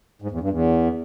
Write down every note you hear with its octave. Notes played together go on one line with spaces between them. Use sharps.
G#2
E2
G2
E2